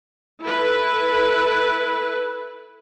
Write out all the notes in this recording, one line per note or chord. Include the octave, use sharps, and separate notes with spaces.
E4 A4 B4